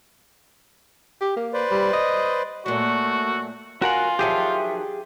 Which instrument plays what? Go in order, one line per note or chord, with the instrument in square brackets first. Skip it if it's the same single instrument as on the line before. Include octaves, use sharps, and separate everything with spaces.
[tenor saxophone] G4
A#3
[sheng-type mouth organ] B4 C5 D5
[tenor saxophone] G3
D#5
[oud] A#2 F#3 [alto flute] A3 [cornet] F#4
[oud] C#4 [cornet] F4 [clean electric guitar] F#4 A#4 F#5 [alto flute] G#5
[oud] D#3 F3 F#3 [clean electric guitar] G4 G#4 [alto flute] E5